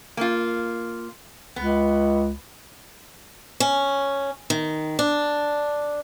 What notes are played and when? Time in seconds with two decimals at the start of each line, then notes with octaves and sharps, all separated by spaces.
0.17 A#3 F4
1.56 C#2 B3
3.60 C#4
4.50 D#3
4.99 D4